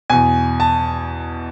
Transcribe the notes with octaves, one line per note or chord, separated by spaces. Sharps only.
E2 B2 G#5
A5